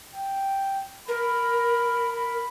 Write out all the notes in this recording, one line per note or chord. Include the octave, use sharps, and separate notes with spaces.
G5
A#4 B5
B5